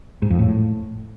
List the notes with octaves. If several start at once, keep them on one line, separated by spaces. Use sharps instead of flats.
G#2
F2
A2